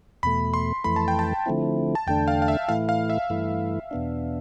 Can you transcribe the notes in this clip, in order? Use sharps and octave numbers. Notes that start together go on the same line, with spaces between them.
E2 B2 A3 B5
C6
F2 E3 A3 B5
A5
G5
A5
D3 F3 A3 C4 E4
A5
E2 D3 A3 D4 G5
F5
F5
E5
A2 E3 A3 E4 F5
F5
E5
G2 E3 A3 E4
E2 B2 B3 D4